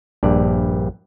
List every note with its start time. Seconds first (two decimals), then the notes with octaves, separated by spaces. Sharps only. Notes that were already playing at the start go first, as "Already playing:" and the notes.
0.23 A#1 G2 D5